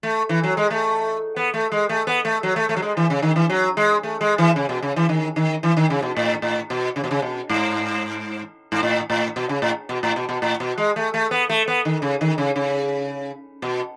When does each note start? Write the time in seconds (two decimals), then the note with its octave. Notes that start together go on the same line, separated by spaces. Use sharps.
0.03 A3
0.29 E3
0.44 F#3
0.57 G#3
0.70 A3
1.36 B3
1.54 A3
1.72 G#3
1.89 A3
2.07 B3
2.25 A3
2.43 F#3
2.56 A3
2.69 A3
2.76 F#3
2.82 G#3
2.97 E3
3.10 C#3
3.22 D#3
3.36 E3
3.50 F#3
3.77 G#3
4.03 A3
4.21 G#3
4.38 E3
4.56 C#3
4.69 B2
4.83 C#3
4.96 E3
5.09 D#3
5.36 D#3
5.63 E3
5.77 D#3
5.90 C#3
6.02 B2
6.17 A2
6.42 A2
6.70 B2
6.96 C#3
7.04 B2
7.11 C#3
7.22 B2
7.50 G#2
8.72 G#2
8.83 A2
9.10 A2
9.36 B2
9.49 C#3
9.62 A2
9.89 B2
10.03 A2
10.16 B2
10.29 B2
10.42 A2
10.60 B2
10.78 G#3
10.96 A3
11.14 A3
11.31 B3
11.49 A3
11.68 B3
11.85 D#3
12.02 C#3
12.21 D#3
12.38 C#3
12.56 C#3
13.62 B2